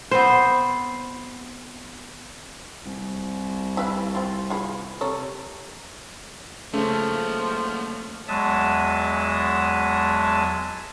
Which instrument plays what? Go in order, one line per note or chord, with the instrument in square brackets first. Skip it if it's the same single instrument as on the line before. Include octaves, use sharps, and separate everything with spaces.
[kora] B3 C4 C5
[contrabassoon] C2
[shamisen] E4 B4 F5
C4 F4
F4 G#4 B4
[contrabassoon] C3 [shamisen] A4 A#4 C#5
[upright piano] C#3 [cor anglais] F3 [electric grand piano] A3 [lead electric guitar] A#3 C#4
[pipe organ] E2 F#3 G#3 E5 A5 D#6